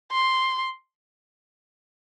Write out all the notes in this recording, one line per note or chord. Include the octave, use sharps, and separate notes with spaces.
C6